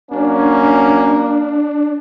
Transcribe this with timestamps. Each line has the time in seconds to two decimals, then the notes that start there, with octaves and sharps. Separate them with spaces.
0.11 F#3 A#3 C#4 D4